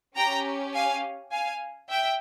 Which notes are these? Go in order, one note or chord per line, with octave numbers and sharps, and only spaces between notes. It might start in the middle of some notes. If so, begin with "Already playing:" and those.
C#4 G4 G5 A#5
F5 G#5
F5 G#5
E5 G5